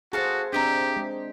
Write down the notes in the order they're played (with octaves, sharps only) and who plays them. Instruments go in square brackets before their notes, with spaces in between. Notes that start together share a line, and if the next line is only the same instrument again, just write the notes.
[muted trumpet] F#4 [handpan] G#4 C5 [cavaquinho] A4 F5 A5
[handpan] C4 D4 [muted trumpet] G4 [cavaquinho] D#5 E5 A#5
[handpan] G#3